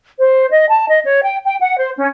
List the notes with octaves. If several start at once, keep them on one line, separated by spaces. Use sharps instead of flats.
C5
D#5
A5
D#5
C#5
G5
G5
F#5
C5
C#4